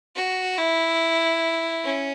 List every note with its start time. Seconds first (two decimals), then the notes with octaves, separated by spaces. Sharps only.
0.16 F#4
0.58 E4
1.84 C#4